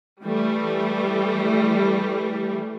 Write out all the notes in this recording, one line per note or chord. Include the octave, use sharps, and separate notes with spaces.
E3 G3 A3